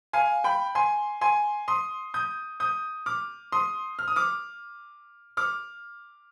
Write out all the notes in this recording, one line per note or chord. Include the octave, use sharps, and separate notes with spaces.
F5 G#5
G5 B5
G#5 C6
G#5 C6
C6 D#6
D#6 G6
D#6 G6
D6 F6
C6 D#6
F6
D#6
D6 F6
D6 F6